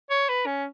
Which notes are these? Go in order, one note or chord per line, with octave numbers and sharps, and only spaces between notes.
C#5
B4
C#4